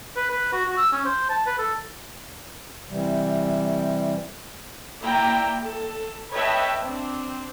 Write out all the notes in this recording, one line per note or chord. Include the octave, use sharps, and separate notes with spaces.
B4
B4
F#4
F#4
E6
C#4
C5
A5
B4
A4
C3 E3 G3
A#3 E4 D5 G5 A#5
A4
B4 C#5 D#5 E5 G5 A5
C4 D4